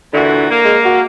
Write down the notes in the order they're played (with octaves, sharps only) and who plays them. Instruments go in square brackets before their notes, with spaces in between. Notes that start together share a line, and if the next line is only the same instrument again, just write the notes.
[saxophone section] A#2 E3 F#4 [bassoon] D3
[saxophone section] A#3
[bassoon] G#3
F#4